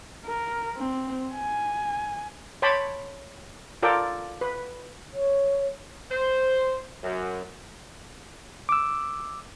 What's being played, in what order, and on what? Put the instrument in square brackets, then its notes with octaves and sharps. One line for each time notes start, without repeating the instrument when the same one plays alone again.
[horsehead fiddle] A#4
C4
G#5
[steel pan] C#5 G5 A5 B5 C6 D6
F4 A4 A#4 D5 G5
B4
[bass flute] C#5
[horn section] C5
F#2
[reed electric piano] D6 E6